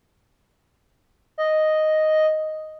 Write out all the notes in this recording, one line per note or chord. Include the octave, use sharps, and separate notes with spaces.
D#5